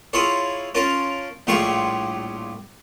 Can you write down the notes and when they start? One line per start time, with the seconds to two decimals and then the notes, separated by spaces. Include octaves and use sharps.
0.13 E4 F4 G#4 A4 C#5
0.75 C#4 F4 A#4 A5
1.47 A#1 A2 G3 F4 G#4 C#6